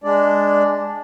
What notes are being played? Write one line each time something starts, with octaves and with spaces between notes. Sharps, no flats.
G#3 D4 D5